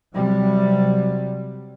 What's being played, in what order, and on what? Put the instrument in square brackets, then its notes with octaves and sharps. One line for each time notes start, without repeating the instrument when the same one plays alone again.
[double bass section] C3 F#3 G3